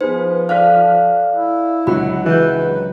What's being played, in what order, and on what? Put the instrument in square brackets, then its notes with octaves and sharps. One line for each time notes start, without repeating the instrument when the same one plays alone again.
[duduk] F3 [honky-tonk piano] B3 G#4 B4 [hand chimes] D#4 C5
[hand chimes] A4 D5 F5 [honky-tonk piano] F6 F#6 B6
[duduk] E4
[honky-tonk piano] C#2 D3 F#4 [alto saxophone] F#3 [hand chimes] B5
[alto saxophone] E3 [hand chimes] G#4 G6 [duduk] B4
[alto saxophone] F#3